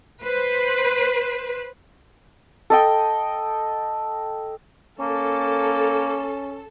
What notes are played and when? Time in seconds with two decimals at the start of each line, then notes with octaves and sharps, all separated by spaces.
0.23 B4 C5
2.70 A4 D#5 G5
5.00 A#3 C#4 A4